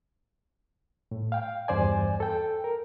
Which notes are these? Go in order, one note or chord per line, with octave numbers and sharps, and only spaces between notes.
A2
F5 G5
E2 G2 C5 D5 G#5
A4 G5
A#4